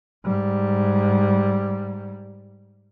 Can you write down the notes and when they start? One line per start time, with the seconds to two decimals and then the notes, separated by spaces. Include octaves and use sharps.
0.25 G#2 G3